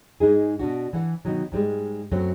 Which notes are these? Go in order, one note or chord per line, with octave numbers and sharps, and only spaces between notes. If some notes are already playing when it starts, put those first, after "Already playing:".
G#2 G#3 D#4 G#4
B2 D4 F#4
E3 F#5
B2 D#3 F#3
G#2 G3 G#3
F#2 F#3 A3 C4